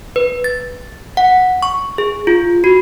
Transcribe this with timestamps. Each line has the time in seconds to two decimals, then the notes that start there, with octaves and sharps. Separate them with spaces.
0.16 B4
0.44 A6
1.17 F#5
1.62 C#6
1.98 G#4
2.27 F4
2.64 F#4